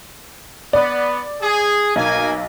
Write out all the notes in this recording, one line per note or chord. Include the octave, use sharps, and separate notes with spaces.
B3 D5
G#4
B1 A#3 G#5